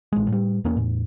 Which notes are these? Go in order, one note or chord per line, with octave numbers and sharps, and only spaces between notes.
A1 G#3
A2 G3
E2 A#3 C#4
E2 A2